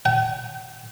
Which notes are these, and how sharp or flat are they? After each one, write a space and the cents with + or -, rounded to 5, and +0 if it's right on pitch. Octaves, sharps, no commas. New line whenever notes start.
G5 -45